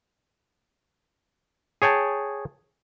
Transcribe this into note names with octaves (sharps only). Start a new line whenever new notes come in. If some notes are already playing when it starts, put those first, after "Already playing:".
G#4 C#5 G5 A5